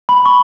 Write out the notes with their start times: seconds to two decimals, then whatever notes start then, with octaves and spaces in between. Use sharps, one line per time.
0.09 B5
0.26 C#6